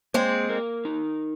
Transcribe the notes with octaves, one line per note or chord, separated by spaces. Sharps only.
G#3 A#3 C4
A#4
D#4